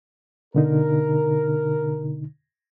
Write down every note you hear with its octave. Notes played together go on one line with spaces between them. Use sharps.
B2 D3 D#4 A#4